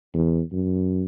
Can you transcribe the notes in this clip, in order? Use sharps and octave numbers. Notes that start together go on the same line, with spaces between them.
E2
F#2